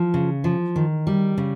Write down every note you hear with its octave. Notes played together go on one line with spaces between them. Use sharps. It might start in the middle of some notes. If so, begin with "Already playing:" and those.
Already playing: F3
C#3
F3
D#3
G3
C#3